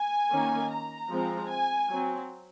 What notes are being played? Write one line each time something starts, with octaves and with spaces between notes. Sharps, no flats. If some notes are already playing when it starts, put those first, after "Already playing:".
Already playing: G#5
D#3 A#3 C#4
A#5
F3 G#3 C4
G#5
F#3 C4